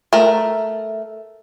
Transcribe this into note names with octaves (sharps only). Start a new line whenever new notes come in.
A3 A#4